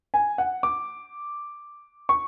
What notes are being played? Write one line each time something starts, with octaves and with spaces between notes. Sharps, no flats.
G#5
F#5
D6
C#6